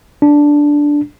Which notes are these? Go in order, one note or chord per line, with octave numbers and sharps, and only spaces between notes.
D4